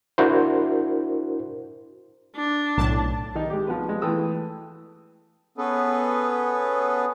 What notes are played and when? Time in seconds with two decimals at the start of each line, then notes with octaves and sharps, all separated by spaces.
0.18 D4 E4 F#4 A#4 C5
2.35 D4
2.78 B1 A2 A5
3.35 D#3 D#4
3.50 G#3 G4
3.67 F3 B3 B4
3.89 G#3
4.02 E3 A3 B4 G5 D#6 E6
5.58 B3 C#4 G#4 A4 B4